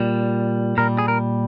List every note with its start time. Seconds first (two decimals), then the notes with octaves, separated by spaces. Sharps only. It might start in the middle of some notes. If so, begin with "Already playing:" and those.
Already playing: A#2 G3
0.77 A#2 G3 A#4
0.98 G#4
1.08 A#4